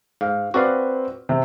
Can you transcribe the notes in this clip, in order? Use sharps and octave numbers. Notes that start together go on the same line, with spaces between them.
G#2 F5
C4 F#4 B4 D5 F5
C3